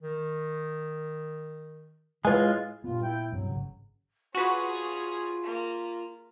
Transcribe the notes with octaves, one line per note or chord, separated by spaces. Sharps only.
D#3
A2 G#3 F4 B4 G#5
G2 A#2 B3 F4
E4 G5
G2 C3 F#3
G#1 C#3
C#4 F4 F#4 G#4 B4
A#3